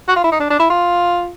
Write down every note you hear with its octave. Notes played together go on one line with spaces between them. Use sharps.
F#4
F4
E4
D#4
D4
D4
E4
F4